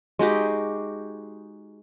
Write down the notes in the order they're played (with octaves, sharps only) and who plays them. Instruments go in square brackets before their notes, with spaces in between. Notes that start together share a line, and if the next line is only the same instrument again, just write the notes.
[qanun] G#3 D#4 F#4 G4